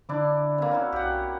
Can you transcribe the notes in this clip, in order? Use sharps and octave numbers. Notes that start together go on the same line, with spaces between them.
D3 D4 E4 D6
C3 A#3
C#4 E4 F#4
B1 G4 F#5